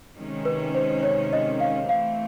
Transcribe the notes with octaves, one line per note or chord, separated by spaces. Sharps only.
C3 D#3 G#3 C#4
B4
C5
C#5
D#5
F5
E3 A3 C4 F5